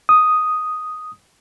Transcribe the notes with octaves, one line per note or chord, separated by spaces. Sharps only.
D#6